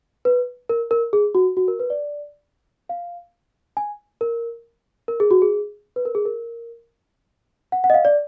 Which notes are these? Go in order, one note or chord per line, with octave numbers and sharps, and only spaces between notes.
B4
A#4
A#4
G#4
F#4
F#4
A#4
B4
D5
F5
G#5
A#4
A#4
G#4
F#4
G#4
B4
A#4
G#4
A#4
F#5
F#5
D#5
F5
D5